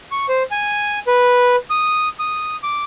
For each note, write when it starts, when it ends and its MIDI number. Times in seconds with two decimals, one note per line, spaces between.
0.11 0.26 85
0.29 0.43 72
0.51 0.99 80
1.07 1.56 71
1.70 2.08 87
2.19 2.56 87
2.63 2.84 86